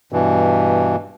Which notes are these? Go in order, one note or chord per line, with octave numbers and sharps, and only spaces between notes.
G2 B2 E3